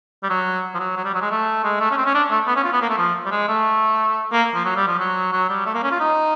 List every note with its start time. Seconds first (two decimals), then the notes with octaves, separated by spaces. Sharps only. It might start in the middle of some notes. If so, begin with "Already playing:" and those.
0.23 G3
0.29 F#3
0.74 F3
0.80 F#3
0.97 F#3
1.05 G3
1.14 F#3
1.21 G#3
1.31 A3
1.64 G#3
1.80 A3
1.91 C#4
1.97 C4
2.06 C#4
2.14 D4
2.31 A3
2.47 B3
2.56 C#4
2.64 F4
2.73 B3
2.82 A#3
2.89 A3
2.98 F3
3.26 G3
3.31 G#3
3.49 A3
4.32 A#3
4.55 F3
4.65 F#3
4.76 G3
4.88 F3
4.99 F#3
5.33 F#3
5.49 G3
5.66 A3
5.74 A#3
5.83 C#4
5.91 F4
6.00 D#4